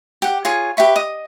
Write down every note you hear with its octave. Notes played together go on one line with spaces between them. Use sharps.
G4 F#5
F4 G#4 C#5 C#6
G4 B4 E5 C#6
D#5 D#6